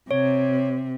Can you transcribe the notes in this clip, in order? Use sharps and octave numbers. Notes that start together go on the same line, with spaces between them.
C3 C#5